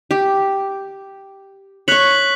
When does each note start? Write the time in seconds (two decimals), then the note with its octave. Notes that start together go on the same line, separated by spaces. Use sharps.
0.11 G4
1.88 C#5 C#6 F#6 B6 F#7